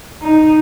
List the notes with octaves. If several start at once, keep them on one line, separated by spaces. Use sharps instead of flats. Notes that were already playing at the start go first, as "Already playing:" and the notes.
D#4